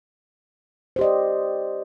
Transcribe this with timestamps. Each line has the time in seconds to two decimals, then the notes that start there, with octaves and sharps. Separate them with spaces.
0.96 C5
0.99 G4
1.01 D#5
1.04 D5